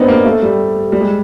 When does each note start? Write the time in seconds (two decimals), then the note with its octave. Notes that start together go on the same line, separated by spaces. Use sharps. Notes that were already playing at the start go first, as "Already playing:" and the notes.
Already playing: B3 C4 D4 D#4
0.08 A#3
0.25 A3
0.42 G3
0.92 G3
1.01 G#3